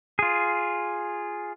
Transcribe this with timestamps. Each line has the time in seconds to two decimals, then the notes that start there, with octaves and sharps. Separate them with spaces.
0.19 F4 G#4